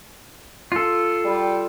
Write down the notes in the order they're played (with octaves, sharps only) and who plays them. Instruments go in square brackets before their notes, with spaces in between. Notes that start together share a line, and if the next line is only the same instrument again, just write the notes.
[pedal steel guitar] F4 A4
[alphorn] G3